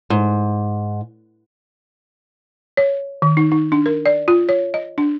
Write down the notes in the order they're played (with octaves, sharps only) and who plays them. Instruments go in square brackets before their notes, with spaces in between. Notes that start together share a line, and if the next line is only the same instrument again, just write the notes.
[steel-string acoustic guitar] G#2
[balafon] C#5
D#3
D#4
D#4
D4
A#4
D5
F4
C#5
D#5
D4